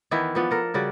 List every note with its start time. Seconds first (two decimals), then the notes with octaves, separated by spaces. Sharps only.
0.11 D#3 E3 B3 E4
0.35 F3 B3 D4
0.51 A4 A#4
0.74 C#3 G3 F#4 D5